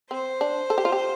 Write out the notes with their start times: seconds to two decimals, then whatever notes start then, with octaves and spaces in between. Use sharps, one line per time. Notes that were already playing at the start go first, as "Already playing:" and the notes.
0.11 C4 C5
0.41 D4
0.70 A4
0.78 G4
0.85 F4
0.92 G4